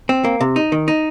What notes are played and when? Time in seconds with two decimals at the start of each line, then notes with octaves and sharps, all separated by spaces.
0.09 C4
0.25 A#3
0.41 C3
0.56 D#4
0.72 D#3
0.88 D#4